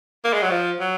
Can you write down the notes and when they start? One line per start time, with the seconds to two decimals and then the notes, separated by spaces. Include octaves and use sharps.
0.24 A#3
0.33 G#3
0.42 F#3
0.50 F3
0.80 F#3